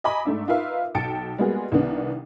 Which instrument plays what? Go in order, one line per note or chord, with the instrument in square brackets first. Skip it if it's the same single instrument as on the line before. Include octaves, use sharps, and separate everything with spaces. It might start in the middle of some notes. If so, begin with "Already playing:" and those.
[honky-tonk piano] D#5 G#5 A#5 B5 D6
G#2 A3 D4 E5
D#4 F4 A#4 B4 E5 F5
B1 G5 A5 A6 C#7 D7
G3 G#3 A#3 B3 F#4 G#4
C2 D#3 B3 D4